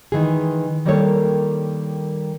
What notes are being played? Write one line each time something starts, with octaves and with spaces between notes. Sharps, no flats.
D#3 E3 G#3 G#4
D#3 G3 A#3 D4 A4 C#5